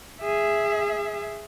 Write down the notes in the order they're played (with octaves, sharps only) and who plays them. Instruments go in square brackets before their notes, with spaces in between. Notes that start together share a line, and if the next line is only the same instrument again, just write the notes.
[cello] G#4 E5